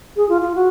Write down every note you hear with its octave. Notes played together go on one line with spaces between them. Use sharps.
G#4
F4
F4
F#4